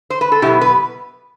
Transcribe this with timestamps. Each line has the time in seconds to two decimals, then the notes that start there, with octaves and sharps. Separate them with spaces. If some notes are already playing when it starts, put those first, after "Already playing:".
0.10 C5
0.21 B4
0.32 A4
0.42 B2 F#3 B3 E4 G4
0.61 B4